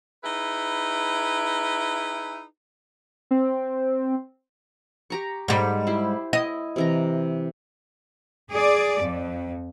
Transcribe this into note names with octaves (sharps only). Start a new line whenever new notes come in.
D#4 E4 G#4 B4
C4
G4 A#5 C#6
G#2 G3
E4 G4 C5
E4 D#5
C3 E3 A#5
G#4 D5
F2